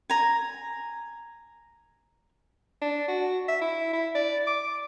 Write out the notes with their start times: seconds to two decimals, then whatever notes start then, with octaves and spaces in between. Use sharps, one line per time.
0.10 G#5 A#5
2.82 D4
3.08 F#4
3.48 E5
3.61 E4
3.93 E4
4.15 D5
4.47 D6